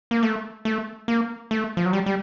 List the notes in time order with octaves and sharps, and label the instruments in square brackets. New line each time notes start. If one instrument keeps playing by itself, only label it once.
[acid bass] A#3
A3
A3
A#3
A3
F3
F#3
G3
G3